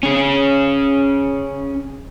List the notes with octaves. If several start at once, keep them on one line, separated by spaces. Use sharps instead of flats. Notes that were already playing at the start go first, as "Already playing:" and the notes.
C#4 G#4